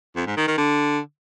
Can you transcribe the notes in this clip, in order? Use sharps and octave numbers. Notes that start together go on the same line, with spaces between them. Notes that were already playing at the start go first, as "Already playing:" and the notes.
F2
G#2
D#3
D#3
D3